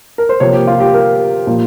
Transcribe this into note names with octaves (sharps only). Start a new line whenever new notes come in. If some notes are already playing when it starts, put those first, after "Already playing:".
A#4
C5
C3 F3 A#3 C#5
G4
F4
G4
A#4
A#2 F3 A#3